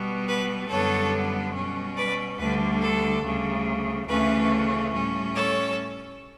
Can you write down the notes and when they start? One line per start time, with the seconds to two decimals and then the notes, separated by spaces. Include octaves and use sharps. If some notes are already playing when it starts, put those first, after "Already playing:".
Already playing: B2 G3 B3
0.28 B4
0.69 F#2 D3 G3 B3 A4 C#5
1.54 B2 G3 C#4
1.97 B4 D5
2.39 D2 D3 G3 B4
2.81 A4
3.24 D2 C#3 G3
4.08 D2 C#3 E3 A3 C#4 B4
4.93 A2 G3 C#4
5.35 A4 C#5